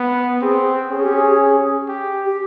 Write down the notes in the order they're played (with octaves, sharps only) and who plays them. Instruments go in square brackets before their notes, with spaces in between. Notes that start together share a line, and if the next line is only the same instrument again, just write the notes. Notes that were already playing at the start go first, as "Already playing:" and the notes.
Already playing: [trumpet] B3
[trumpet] C4 [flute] G#4
[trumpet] C#4 [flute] G#4
[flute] G4
G#4
[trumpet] G4
[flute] G4